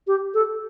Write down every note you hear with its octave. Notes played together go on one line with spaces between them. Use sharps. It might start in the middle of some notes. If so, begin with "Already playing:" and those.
G4
A4